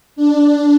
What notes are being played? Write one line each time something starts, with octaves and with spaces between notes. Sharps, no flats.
D4